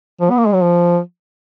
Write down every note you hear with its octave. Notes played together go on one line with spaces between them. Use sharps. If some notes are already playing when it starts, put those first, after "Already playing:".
F3
B3
A#3
G#3
F#3
F3